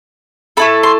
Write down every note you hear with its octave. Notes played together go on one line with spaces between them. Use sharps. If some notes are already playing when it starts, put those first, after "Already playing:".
A3 E4 A4 B5
C6